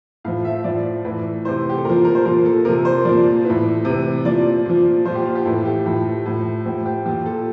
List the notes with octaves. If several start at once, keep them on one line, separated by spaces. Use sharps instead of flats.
A2 F3 F5
E5
A2 F3 D5
A2 E3
C3 E3 C5
G4
A4
A#2 F3 A#4
A#4
C5
A#2 F3 A#4
A4
C3 F3 A#4
C5
A#2 F3 D5
A2 E3
C3 E3
A#2 F3 D5
A#2 F3
A#2 F3 C5
G4
F4
G4
A2 E3 A4
G4
A2 F3
A2 F3
A2 F3 G4
G4
A#2 F3 G4
A4